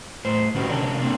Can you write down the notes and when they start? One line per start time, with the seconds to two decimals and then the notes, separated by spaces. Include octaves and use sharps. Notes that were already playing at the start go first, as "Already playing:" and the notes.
0.25 A2 C5
0.55 D3 C#4 F#4 G4
0.69 C3 C#4 D4 A#4
1.00 A#3 C4 D4